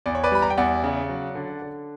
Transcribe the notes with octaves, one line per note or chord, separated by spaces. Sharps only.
E2 D5
C#5
B4 D5
G3 B5
A#5
G5
E2 D5 F#5
C#3
F#3
D3
D3